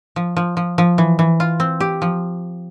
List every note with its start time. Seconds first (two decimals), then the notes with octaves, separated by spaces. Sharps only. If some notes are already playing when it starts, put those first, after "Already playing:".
0.16 F3
0.37 F3
0.57 F3
0.78 F3
0.98 E3
1.19 E3
1.40 F4
1.60 C4
1.80 G4
2.02 F3